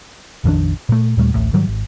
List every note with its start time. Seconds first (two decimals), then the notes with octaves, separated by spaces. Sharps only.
0.44 A#1 F2 D#3 D4
0.89 A#2 A3
1.17 D#2 A#2 G3 A3
1.34 D1 A1 A2
1.53 G#2 D#3 F#3 G3
1.67 G#1